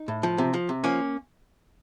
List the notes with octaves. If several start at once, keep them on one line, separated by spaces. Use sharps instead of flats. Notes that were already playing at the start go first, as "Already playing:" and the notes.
Already playing: D#4
A2
F3
C3
F3
C3
F3 A#3 C#4